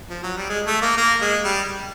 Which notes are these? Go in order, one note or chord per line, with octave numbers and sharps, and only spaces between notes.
F3
F#3
G3
G#3
A3
A#3
A#3
G#3
G3